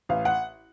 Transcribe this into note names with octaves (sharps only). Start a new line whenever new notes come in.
A1 F5
F#5